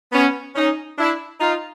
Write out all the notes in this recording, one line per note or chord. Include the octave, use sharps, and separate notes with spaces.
B3 C#4
C#4 D#4
D4 E4
D#4 F4